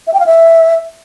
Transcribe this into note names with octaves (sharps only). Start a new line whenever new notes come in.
E5
G5
F5
E5